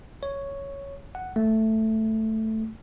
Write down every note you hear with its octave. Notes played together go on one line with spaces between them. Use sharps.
C#5
F#5
A3